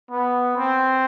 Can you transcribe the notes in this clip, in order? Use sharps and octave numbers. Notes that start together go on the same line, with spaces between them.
B3
C4